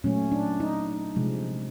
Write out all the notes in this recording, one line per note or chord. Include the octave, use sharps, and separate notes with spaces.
A#2 F#3 A3 C#4
D4
D#4
C3 F3 G#3